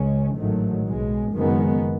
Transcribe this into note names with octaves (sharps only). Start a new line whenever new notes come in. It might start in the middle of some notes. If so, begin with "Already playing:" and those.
Already playing: C#2 C#3 G#3 C#4
A1 G#2 D#3 F#3 A3
B1 B2 G#3
F#1 F#2 D#3 G#3 B3